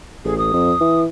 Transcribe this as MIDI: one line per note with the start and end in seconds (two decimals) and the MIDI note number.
0.25 0.49 33
0.25 0.38 68
0.38 1.01 87
0.53 0.73 41
0.81 1.06 52